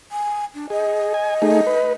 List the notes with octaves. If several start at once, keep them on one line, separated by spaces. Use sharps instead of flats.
G#5
D4
G#4 D#5
G#5
A3 D#4 G#4
B4